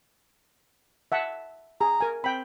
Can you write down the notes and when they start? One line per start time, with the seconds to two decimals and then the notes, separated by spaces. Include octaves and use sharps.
1.12 E5 F#5 A5
1.81 G#4 A#5
2.01 A#4 G#5
2.24 C4 G5 B5